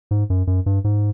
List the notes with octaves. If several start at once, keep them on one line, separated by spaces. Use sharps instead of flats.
G#2
F#2
F#2
G2
G#2